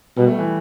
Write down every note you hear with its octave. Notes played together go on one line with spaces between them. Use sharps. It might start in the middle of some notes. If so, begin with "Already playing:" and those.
B2 G3
A3
E3